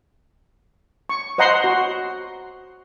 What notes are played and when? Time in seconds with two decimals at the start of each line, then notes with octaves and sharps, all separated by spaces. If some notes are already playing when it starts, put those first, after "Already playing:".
1.09 C#6
1.38 C5 D#5 F#5 A#5 C6
1.64 F#4